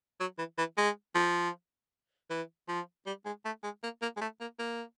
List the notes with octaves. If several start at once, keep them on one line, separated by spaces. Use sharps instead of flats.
F#3
E3
E3
G#3
F3
E3
F3
G3
G#3
A3
G#3
A#3
A#3
G#3
A3
A#3
A#3